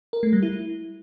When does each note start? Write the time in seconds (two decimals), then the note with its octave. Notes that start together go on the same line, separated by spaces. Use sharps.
0.13 A#4
0.23 A3
0.33 G3
0.43 E4